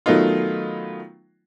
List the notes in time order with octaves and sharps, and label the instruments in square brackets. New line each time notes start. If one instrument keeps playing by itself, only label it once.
[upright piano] D#3 F#3 A3 B3 D#4 F4